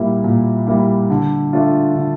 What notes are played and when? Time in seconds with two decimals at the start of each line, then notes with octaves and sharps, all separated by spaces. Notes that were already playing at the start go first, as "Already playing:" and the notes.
Already playing: A#2 G3 A#3 E4
0.24 A#2
0.67 G3 A#3 E4
1.10 D3
1.53 A3 D4 F4
1.95 D3